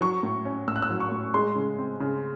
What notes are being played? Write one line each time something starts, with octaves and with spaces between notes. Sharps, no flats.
F#3 C#6
A2
C#4
A2 E6
F#6
E6
F#3
C#6
A2
G#3 C6
C#3
C4
C#3